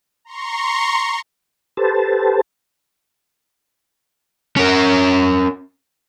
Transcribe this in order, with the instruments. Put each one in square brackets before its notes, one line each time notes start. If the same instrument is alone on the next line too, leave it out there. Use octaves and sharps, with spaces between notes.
[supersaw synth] A#5 C6 C#6
[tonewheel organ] G4 A4 B4 C5 A5
[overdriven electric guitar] C#4 A#4